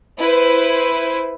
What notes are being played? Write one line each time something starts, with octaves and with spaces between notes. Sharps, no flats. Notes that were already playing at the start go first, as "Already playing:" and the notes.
E4 B4 C5